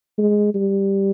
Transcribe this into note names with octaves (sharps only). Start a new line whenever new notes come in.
G#3
G3